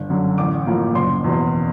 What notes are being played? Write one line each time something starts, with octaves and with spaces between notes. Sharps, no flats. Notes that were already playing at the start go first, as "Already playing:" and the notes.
Already playing: G1
F#2 D3
A1 D6
A2 F3 A#3
F#1 C6
E2 B2